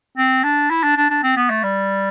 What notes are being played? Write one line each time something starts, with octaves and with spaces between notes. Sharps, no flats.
C4
D4
E4
D4
D4
D4
C4
B3
A3
G3